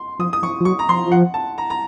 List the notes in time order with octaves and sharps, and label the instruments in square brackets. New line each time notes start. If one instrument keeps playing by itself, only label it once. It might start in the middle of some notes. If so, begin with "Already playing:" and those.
Already playing: [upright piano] C6
[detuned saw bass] F3 [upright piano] D#6
[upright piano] D#6
[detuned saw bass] F3 [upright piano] C#6
[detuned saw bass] F3
[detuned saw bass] F#3 [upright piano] C#6
[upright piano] A#5
[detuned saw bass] F3 [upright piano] C6
[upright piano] F#5
A5
A#5
A#5